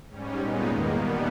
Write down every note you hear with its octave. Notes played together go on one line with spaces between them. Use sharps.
G#2 G3 C#4
A#2 G#3 B3 D#4
E2 D#3 A#3
B2 G3 B3